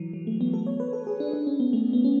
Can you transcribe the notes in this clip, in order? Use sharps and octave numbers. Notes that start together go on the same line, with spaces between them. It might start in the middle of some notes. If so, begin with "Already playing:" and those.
Already playing: E3 F#3
F#3
A3
B3
A4
C#5
B4
A4
G#4
D4
D4
C#4
B3
A3
B3
C#4